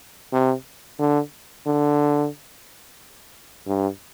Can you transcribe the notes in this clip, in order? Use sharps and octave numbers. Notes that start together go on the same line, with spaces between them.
C3
D3
D3
G2